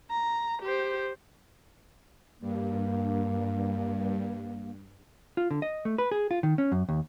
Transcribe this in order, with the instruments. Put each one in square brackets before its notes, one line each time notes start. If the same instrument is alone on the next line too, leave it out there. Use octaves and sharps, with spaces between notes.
[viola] A#5
G4 C5
[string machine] G2 [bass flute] A#3
[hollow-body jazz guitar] F4
D3
D#5
A3
B4
G#4
F4
D#3
C#4
F#2
D#2